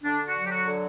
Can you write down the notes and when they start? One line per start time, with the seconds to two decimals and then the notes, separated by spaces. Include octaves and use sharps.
0.04 D3 D4
0.28 F#4
0.36 F#3
0.45 G4
0.51 F#4
0.67 D3